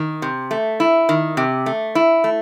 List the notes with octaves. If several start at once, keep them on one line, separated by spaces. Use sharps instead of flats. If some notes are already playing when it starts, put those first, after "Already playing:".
Already playing: D#3
C3
A3
E4
D#3
C3
A3
E4
A3